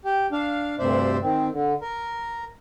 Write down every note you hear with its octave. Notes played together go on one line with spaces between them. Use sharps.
G4
D4 F5
D2 G2 C3 C5 D5 E5
D#3 C4
D3
A#4